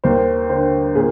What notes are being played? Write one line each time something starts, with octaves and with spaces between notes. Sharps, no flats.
D#2 A#4 C5
D3 A#4 C5
A#2 G#4 A#4